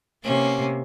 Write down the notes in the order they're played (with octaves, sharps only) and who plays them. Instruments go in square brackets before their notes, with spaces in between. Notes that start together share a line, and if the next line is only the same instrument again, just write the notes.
[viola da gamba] C3 A#3 [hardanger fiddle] C#4